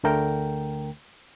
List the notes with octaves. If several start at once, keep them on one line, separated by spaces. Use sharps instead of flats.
D2 D3 A3 A#4 G5